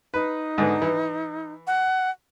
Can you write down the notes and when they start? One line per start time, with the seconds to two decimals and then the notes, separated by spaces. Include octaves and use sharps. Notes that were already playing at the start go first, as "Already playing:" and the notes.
0.14 D#4 B4
0.58 G#2 D3 B3
0.82 E3
1.67 F#5